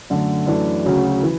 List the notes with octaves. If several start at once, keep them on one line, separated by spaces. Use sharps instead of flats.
F#2 D3 A3
F#2 E3 A3 D4
D2 C#3 F#3 C#4 F#4
E3